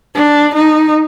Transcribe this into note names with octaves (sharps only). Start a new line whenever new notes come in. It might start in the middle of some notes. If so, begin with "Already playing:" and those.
D4
D#4